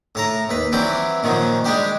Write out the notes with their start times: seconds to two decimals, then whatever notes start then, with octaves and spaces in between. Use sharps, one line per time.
0.15 A2 A5 A#5
0.49 D#2 B4
0.72 E3 F#3 G3 C4 D5
1.23 A#2 D#3 F3 F#3
1.64 G3 G#3 D4 G4 C5